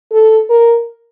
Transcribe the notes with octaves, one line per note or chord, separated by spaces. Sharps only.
A4
A#4